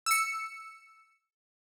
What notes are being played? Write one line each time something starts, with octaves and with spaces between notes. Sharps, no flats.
E6 C#7